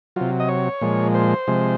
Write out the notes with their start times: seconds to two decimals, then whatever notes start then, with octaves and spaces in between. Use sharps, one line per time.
0.16 C3 F#3 F4
0.40 D#5
0.49 C#5
0.81 A#2 F3 G#3
1.14 C5
1.47 C3 F3 G#3